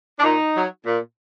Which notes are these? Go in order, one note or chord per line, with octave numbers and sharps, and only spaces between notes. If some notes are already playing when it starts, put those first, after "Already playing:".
D4
A#2 D#4
F#3
A#2